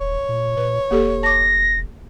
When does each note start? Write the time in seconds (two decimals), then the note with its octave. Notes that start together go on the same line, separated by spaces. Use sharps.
0.01 D#1 C#5
0.29 A#2
0.57 A#2 B4
0.91 E1 A#3 G4 A4
1.23 A5 D6 A#6